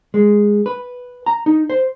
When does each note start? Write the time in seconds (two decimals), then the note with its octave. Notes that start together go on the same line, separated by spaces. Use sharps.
0.14 G#3
0.66 B4
1.26 A#5
1.46 D#4
1.70 C5